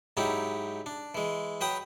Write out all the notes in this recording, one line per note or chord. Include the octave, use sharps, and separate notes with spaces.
G#2 F#3 D#4 E4 G4
D4
E3 G#3
F#3 B4 G5 D#6